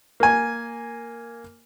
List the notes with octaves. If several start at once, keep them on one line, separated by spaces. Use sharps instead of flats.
A#3 G#5